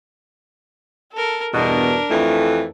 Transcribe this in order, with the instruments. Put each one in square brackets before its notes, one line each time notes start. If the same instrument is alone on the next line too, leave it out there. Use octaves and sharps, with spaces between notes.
[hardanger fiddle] A4 A#4
[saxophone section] E2 G2 B2 [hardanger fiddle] D4 A#4
[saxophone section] F2 E3 A3